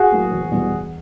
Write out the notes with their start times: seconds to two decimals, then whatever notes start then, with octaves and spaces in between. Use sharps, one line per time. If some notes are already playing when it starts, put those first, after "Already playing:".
Already playing: F#4 G#4
0.12 A2 F#3 A#3
0.31 E1
0.52 E2 B2 G3
0.71 E1